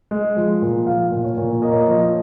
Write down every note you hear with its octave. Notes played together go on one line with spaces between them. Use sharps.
G#3
F3
A#2
F3 F5
A#2
C#5
A#2
A#3 D#5
C#5
D#5
F3